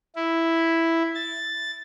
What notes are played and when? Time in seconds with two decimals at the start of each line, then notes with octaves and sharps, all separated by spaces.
0.16 E4
1.15 A6